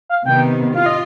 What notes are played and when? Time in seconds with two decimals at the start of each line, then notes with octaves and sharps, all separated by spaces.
0.09 F5
0.26 C3 D#3 B3 G5
0.75 F4 F5
0.86 D#5